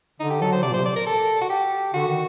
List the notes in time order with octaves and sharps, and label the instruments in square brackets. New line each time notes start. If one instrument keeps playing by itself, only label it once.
[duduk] D3 [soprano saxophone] D#4
[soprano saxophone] G4
[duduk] F#3 [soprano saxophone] A4
[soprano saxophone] C5
[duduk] C3 [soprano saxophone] D5
[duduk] A#2
[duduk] C3 [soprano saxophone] C5
[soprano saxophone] D5
A#4
A4
F#4
G4
[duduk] D3 [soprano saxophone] F#4
[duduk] D#3